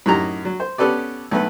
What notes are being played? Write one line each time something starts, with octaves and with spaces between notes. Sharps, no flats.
F#2 A2 D#4 G4 A#5
F#3
C5
B3 C#4 G4 A4 B4 D5
B1 A3 B4